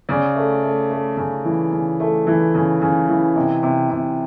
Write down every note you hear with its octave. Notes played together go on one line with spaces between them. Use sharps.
C#3 D5
A3
A3
A3
C#3
E3
C#3
A3
E3
C#3
C#3
E3
C3 D#5
C3
C3